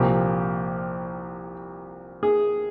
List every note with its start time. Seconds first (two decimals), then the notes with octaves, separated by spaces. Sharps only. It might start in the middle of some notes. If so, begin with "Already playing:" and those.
Already playing: C2 A#2 F3 G4
2.23 G#4